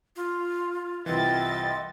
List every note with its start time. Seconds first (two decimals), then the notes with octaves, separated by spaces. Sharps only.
0.16 F4
1.06 C2 E3 C4 F4 D#5 E5 A6